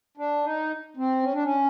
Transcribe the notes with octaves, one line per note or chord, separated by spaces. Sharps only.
D4
D#4
C4
C#4
D4
C#4